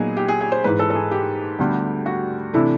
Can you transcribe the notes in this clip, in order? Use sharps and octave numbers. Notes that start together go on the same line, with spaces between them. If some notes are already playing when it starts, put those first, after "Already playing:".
Already playing: A#2 F#3 B3 D#4 G#4
G4
G#4
G#4
C5
G#2 E3 G#3 B4
A4
A4
G#4
G4
D2 D3 G3 B3
F#4
C3 E3 A3 D4 E4